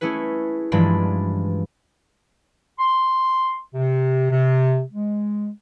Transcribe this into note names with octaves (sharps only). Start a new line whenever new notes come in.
A3 C#4 E4 G#4 B4
G2 E3 F3 G#3 D4 B5
C6
C3
C3
G#3